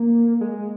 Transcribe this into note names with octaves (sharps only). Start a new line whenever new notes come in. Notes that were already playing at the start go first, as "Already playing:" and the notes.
Already playing: A#3
G#3